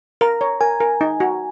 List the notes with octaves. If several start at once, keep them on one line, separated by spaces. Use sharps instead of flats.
A#4 A#5
C#5
A#4 G#5
A#4
D#4
F#4